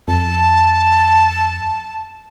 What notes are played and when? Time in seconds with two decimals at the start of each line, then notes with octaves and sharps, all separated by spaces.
0.08 F2 A5